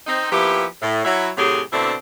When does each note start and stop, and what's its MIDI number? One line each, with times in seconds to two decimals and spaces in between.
0.07 0.29 60
0.07 0.29 63
0.31 0.65 53
0.31 0.65 58
0.31 0.65 59
0.31 0.65 64
0.31 0.65 67
0.81 1.03 45
1.04 1.29 54
1.04 1.29 64
1.37 1.61 45
1.37 1.61 48
1.37 1.61 54
1.37 1.61 67
1.37 1.61 68
1.72 1.93 47
1.72 1.93 50
1.72 1.93 57
1.72 1.93 60
1.72 1.93 62
1.72 1.93 64